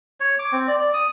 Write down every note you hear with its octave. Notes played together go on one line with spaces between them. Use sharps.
C#5
D6
C4
D5
D5
D#6